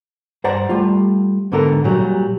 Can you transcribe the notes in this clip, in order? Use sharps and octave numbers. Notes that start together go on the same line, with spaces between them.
G2 C5 D5 F#5 A#5
G3 A3 F4
G#2 D3 B3 A4 A#4
A#2 F#3 G3